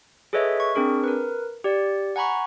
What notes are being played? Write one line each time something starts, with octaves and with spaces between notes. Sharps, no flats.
G#4 A4 B4 C#5 D#5 E5
C#6
C4 D4 G#4 A#4
A#4 B4
G4 D5
F#5 G#5 A#5 B5 C#6